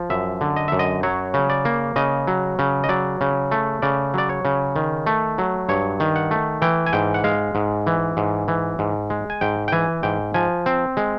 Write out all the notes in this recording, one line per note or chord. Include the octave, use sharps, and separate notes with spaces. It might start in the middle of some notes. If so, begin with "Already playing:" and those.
Already playing: F3
F#2 E5
D3
D#5
F#2 E5
D#5
F#3 C#5
C#3
D5
A#3
C#3 D#5
F#3
C#3
D#5
F#3 D5
C#3
A3
C#3 D5
F#3 D5
C#5
C#3
D#3
A3
F#3
G2 C#5
D#3
F#5
A3
E3 G5
G#5
G#2 G5
F#5
G#3 F5
G#2
E3
G#2
E3
G#2
G#3
G#5
G#2 G5
G5
E3 G#5
G#2 G5
F3 G#5
C4
G#3